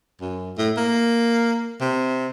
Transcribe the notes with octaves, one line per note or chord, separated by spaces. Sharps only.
F#2
A2
A#3
C3